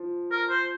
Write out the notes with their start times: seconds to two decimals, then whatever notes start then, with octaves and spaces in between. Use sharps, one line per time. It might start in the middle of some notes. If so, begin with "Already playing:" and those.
Already playing: F3
0.32 A#4
0.50 C5